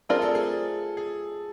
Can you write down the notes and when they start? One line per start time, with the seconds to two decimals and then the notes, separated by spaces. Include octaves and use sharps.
0.09 A3 C4 F4 G#4 A#4 D5
0.22 A4
0.35 G#4
0.97 G#4